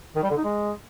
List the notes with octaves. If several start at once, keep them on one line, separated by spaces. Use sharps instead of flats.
D#3
G3
D3
D#4
G#3